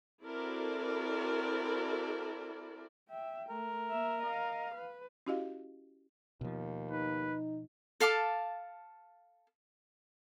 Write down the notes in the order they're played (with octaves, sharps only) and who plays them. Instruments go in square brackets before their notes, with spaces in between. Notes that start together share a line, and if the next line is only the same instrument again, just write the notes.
[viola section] C4 E4 F#4 A4 A#4 D5
[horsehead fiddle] E5 G5
[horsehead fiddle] A3 [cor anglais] A#4
[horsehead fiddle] A#3 E5
D#5 F5
B4
[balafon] C#4 E4 F#4 G4 D#5 F5
[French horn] D#2 [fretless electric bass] B2 F3
[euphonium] D#4 [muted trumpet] B4
[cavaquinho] A4 F5 A5 D6